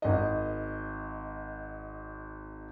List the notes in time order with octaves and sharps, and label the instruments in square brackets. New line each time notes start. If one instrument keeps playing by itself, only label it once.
[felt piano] G#1 D#5